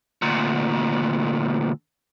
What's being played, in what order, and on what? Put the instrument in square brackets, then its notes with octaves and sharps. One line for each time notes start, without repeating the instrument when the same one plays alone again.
[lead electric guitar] D2 A#2